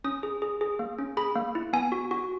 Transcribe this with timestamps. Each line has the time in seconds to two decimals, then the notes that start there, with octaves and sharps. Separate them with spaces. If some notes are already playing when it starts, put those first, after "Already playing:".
0.04 C#4 D#6
0.23 G#4
0.42 G#4
0.61 G#4
0.79 A#3
0.99 C#4
1.17 G#4 B5
1.35 A#3
1.55 E4
1.73 B3 G#5
1.92 F#4
2.11 F#4